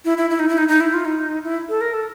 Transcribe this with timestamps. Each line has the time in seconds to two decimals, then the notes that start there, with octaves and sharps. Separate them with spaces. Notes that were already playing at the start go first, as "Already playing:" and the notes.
0.05 E4
0.18 E4
0.30 E4
0.39 D#4
0.49 E4
0.58 D#4
0.68 D#4
0.81 E4
0.93 F4
1.05 D#4
1.44 E4
1.69 A4
1.81 A#4
1.94 A4